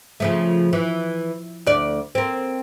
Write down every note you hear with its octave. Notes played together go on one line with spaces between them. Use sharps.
C#3 F3 A3
E3
D2 D5
A#3 C4